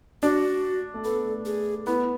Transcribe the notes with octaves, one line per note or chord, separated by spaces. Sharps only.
D4 F#4
A3
B3 A4
G#4
B3 E4